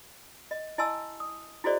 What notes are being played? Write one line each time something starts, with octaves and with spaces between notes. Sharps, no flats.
D#5
E4 D#5 G#5 A5 C6 E6
D#6
E4 F#4 G#4 C5 D5 D#5